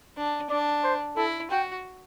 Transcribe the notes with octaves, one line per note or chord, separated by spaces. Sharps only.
D4
D4 D5
C5
E4 A4
F#4 G5